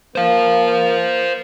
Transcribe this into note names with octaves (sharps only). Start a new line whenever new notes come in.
A#3 C5 F5